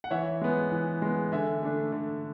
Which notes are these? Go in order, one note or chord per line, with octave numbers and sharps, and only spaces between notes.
F#5
E3 C#5 E5
G#3 B3
E3
G#3 B3
D3 E5 G#5
A3 D4
D3